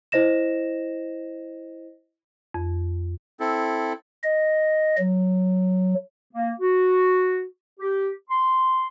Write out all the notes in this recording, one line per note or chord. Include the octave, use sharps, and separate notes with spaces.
E4 C5 D#5 A#6 E7
F2
C4 E4 A4
D#5
F#3
A#3
F#4
G4
C6